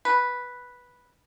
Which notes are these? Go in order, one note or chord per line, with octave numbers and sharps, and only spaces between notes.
B4